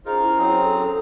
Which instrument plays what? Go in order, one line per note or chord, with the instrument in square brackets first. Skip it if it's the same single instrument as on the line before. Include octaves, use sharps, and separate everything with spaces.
[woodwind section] C#4 C5 A#5 [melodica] D#4 F4 A#4 [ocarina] G#4
[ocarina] E4
[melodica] F#3 C4 G#4
[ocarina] A4